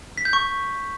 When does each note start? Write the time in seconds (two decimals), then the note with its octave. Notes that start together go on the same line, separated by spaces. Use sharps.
0.18 B6
0.25 G6
0.33 C#6